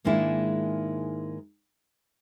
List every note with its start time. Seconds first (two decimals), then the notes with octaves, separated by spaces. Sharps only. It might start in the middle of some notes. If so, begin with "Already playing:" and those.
0.05 G#2 D#3 G#3 A#3 D4 E4